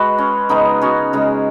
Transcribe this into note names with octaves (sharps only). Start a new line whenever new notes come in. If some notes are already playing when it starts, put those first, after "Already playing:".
Already playing: G#3 F#4 B4
C#4
C#3 G#3 B3 D#4
C#4 F#4
C#3 G#3